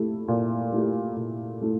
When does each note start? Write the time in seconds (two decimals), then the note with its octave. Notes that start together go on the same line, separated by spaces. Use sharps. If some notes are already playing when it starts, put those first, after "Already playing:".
Already playing: A#2 A3 E4 G4
0.28 A#2
0.72 A3 E4 G4
1.16 A#2
1.61 A3 E4